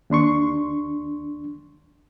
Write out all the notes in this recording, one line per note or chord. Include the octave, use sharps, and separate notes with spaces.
D#2 D4 C6 C#6